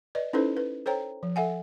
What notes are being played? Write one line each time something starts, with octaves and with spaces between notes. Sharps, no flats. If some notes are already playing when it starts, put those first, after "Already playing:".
B4 D5 D#5
C#4 D#4 E4 A4 B4 C5
B4
A4 C5 C#5 G5 A#5
F3
A4 E5 F#5 G#5